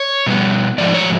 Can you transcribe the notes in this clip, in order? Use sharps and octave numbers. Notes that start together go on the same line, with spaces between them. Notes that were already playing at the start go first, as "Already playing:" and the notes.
Already playing: C#5
B2 G3 B3
G#2 F3 A3 D5
C#5